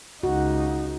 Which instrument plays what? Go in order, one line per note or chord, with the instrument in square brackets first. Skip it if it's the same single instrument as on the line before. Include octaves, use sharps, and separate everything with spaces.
[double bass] C#2 D#4 [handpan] F#4